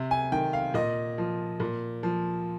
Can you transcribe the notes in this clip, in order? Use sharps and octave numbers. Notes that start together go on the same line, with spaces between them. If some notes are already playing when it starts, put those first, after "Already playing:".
Already playing: C3
G#5
D#3 G5
F5
A#2 D#5
F3
A#2
F3